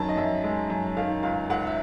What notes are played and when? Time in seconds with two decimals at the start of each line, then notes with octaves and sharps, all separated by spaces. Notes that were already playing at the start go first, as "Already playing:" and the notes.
Already playing: F#2 D#3 A5
0.09 D#5
0.17 F#2 E5
0.43 G#3
0.70 F#2
0.97 D#3 F5
1.23 C#2 F5
1.50 C#2 F#5
1.67 E5